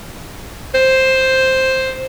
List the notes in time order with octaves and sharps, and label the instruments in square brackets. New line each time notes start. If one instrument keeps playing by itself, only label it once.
[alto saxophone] C5